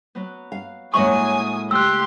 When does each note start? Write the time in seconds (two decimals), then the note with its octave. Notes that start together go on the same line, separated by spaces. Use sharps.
0.15 F#3 B3
0.52 F5
0.94 A2 F#3 G#3 A#3 D4 G#5 C#6 D#6
1.71 C#3 A3 G4 C6 E6 F#6